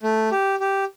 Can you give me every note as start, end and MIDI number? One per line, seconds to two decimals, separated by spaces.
0.03 0.29 57
0.31 0.56 67
0.60 0.84 67